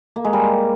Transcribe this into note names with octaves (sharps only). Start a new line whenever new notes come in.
A#3
G#3
G3